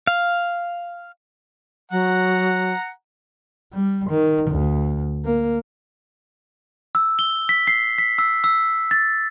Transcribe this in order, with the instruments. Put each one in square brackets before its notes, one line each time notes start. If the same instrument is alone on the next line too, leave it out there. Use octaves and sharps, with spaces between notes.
[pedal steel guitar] F5
[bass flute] F#3 [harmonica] F#5 A#5
[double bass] G3
D#3
D2
A#3
[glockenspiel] E6
G7
B6
C7
B6
E6
E6
A6